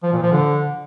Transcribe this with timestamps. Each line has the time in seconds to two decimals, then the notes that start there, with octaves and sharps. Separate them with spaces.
0.03 F3
0.13 A#2
0.22 F3
0.32 D3